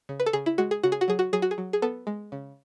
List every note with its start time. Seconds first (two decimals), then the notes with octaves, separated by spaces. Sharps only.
0.09 C#3
0.20 B4
0.26 A4
0.33 C#3 G#4
0.46 E4
0.58 G#3 F#4
0.71 G#4
0.83 C#3 F#4
0.92 G#4
1.01 F#4
1.08 F#3 G#4
1.19 F#4
1.33 F#3 G#4
1.42 F#4
1.51 G#4
1.58 F#3
1.73 G#4
1.82 B3 A4
2.07 G#3
2.32 C#3